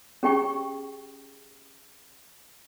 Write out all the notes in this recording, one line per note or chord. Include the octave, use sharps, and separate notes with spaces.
C#4 G4 G#4 G5 C#6